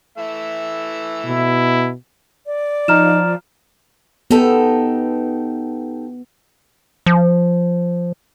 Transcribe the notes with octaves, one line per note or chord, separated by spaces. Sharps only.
E3 A3 E5
B2 E4
D5
F3 D#4 A#5 F6 E7
B3 D#4 G4 A4
F3